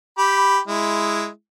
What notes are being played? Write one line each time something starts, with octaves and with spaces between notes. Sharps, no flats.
G4 B5
G#3 E4